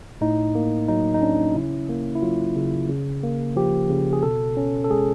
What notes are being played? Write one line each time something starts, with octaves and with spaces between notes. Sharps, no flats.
A2 D#4
A#3
F#3 D#4
D#4
C#4 D4
C#3 E4
A#3
E4
F#3 F4
C#3
C#3
A#3
F3 G4
C#3
G#4
B2 A4
C#4
A4
G#3 G#4